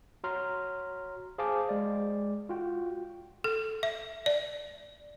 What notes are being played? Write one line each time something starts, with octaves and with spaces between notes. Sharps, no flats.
F#4 C#5 A#5 C6 F6
G#4 C5 F5 G#5 A5 D6
G#3 D5
F4 F#4 G5
A4
E5
D5